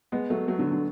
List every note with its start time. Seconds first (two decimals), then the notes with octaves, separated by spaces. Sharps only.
0.12 G#3 B3
0.30 F#3 A3
0.48 F#3 A3
0.59 D3 F#3
0.71 D3 F#3